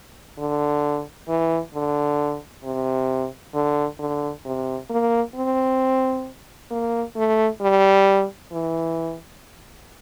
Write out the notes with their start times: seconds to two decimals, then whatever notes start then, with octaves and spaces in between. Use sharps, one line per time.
0.39 D3
1.29 E3
1.74 D3
2.64 C3
3.55 D3
4.00 D3
4.45 C3
4.90 A#3
5.36 C4
6.71 A#3
7.16 A3
7.62 G3
8.52 E3